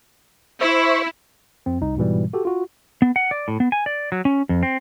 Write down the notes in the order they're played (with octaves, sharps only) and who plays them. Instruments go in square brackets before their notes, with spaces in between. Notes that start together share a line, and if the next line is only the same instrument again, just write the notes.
[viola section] E4 [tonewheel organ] C5 E5 C#6
[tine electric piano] F2 C4
C2 D#4
G#2 B2 E3 G3
F#4 G4 A4
F4 F#4
[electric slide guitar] B3
F#5
D5
A2
B3
G#5
D5
F#3
C#4
F2
C4